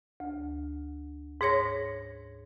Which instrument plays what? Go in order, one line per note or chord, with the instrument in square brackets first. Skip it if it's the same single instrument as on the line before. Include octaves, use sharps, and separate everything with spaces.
[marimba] D2
G#2 G#4 C#5 A#6